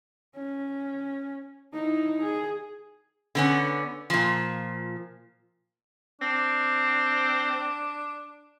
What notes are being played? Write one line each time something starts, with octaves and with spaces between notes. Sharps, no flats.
C#4
D#4 E4
G#4
D3 B3 C#4
A#2 F3
C4 D4